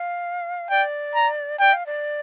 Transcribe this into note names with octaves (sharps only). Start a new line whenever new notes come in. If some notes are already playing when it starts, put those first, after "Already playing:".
Already playing: F5
D5 G5
A#5
D5 G5
F5
D5